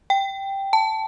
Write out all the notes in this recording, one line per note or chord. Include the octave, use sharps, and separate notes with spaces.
G5
A5